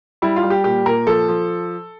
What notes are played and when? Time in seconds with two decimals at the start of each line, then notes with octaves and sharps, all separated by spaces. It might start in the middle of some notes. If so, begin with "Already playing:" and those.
0.22 G3 E4
0.36 F4
0.43 G3
0.50 G4
0.64 A#2 G4
0.86 A#2 A#4
1.07 F3 A4
1.28 F3